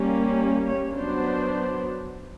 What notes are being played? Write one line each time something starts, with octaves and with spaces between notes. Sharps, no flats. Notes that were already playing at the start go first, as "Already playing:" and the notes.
Already playing: G3 A#3 C#4
C#5
F#3 B3 D4 C5